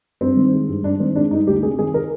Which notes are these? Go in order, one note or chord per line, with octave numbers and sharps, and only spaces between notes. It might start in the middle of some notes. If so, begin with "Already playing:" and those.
G2 C4
D#3
G#3
G2
G2 D4
D#3 C4
G#3 D4
G2 D#4
D2 G4
C3 G#4
D#3 G#4
A#4